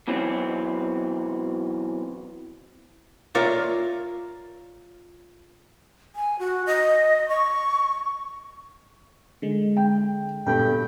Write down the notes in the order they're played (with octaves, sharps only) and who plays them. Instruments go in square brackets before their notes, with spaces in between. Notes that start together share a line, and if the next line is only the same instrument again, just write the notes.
[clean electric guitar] B2 E3 F#3 C4
[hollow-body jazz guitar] F4 A#4 C#5 D5 E5 F5
[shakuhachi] G#5
F#4
D#5
C#6
[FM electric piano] D3 G#3
[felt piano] G5
[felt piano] G2 [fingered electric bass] A#2 B3 [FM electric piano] A4 B5 [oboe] G5